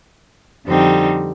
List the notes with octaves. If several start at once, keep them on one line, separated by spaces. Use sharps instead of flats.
F2 D3 G3 C4 D#4